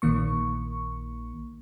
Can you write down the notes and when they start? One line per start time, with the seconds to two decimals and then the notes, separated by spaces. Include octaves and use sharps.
0.02 A#1 D#3 A#3 C#6